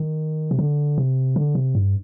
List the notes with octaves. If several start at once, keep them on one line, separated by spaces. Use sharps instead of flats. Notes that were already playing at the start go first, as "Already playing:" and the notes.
Already playing: D#3
C3
D3
C3
D3
C3
G2